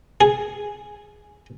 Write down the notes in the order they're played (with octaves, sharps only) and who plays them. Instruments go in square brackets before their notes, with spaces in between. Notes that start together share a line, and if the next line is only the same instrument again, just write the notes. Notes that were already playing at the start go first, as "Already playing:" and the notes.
[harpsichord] G#4